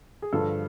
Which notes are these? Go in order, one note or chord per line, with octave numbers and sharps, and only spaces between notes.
G#4
G2 D3 F3 A4